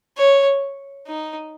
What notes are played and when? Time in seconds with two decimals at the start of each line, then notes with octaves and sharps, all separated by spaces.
0.17 C#5
1.08 D#4